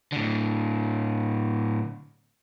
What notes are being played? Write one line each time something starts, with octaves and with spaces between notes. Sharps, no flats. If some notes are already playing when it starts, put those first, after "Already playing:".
A2 D3